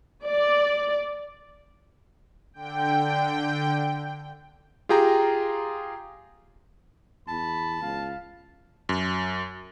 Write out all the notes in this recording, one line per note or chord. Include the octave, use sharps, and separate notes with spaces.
D5
D3 G5
F4 G4 G#4 G5 A#5
E2 A5 B5
C#2 F5
F#2